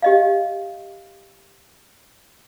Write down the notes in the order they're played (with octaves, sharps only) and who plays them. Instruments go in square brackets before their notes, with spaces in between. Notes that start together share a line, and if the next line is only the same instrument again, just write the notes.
[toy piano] G4 D#5 F5